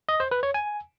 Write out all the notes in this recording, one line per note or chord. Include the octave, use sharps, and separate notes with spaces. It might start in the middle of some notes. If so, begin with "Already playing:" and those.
D#5
C5
B4
C#5
G#5